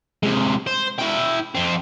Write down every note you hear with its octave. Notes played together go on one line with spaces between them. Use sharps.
C3 G#3
C5
E4 G5
F2 C4